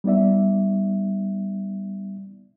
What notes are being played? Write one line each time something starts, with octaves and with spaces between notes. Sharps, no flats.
G3 B3 D#4 D5 E5